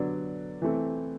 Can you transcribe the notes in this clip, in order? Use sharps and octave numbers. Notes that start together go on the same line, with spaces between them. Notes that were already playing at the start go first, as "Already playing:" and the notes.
Already playing: D3 F#3 B3 D5
E3 A3 C4